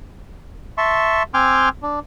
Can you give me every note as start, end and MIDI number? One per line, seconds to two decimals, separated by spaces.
0.78 1.23 76
0.78 1.23 81
0.78 1.23 84
0.78 1.23 85
1.34 1.69 60
1.34 1.69 79
1.34 1.69 80
1.34 1.69 84
1.34 1.69 86
1.34 1.69 89
1.83 1.99 62